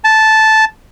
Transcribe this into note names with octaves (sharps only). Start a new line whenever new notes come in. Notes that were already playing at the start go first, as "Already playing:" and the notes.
A5